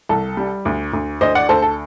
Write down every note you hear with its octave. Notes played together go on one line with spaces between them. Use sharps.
C2 A4
G3
D2
D2
D2 C5 D#5
D5 F#5
D2 A4 C5
A4